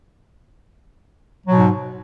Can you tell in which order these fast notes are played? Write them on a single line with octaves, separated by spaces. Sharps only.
F#3 B2 G#2